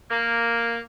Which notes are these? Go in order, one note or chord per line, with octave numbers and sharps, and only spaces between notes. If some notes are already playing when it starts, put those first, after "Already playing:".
A#3